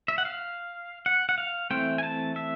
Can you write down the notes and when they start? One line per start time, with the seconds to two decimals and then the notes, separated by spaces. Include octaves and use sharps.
0.08 E5
0.18 F#5
0.25 F5
1.06 F#5
1.29 F#5
1.38 F5
1.70 E3 A3 C4 G5
1.98 G#5
2.03 A5
2.36 E5